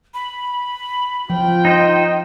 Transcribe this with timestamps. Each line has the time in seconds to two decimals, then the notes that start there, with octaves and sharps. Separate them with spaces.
0.14 B5
1.30 F3 F4 G5
1.65 D#4 C5 D#5